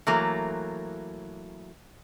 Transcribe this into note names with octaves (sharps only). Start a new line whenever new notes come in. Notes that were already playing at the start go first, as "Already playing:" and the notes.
E3 F#3 A3 A#3